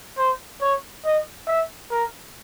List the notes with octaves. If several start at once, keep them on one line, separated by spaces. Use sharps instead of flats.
C5
C#5
D#5
E5
A#4